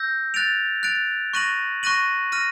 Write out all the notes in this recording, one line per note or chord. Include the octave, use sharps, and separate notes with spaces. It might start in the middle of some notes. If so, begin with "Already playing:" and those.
Already playing: E6 G6 A#6
F#6 A6 D7 F7
F#6 A6 D7 F7
C#6 F#6 A#6 D#7 F#7
C#6 F#6 A#6 D#7 F#7
F6 A#6 D#7